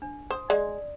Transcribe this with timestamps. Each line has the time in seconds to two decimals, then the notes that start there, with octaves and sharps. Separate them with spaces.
0.02 D4
0.30 C5 D#6
0.50 G#3 D5